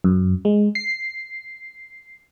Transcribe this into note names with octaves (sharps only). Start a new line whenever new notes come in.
F#2
G#3
C7